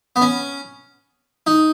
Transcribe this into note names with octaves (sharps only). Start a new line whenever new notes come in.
B3
C#4
D#4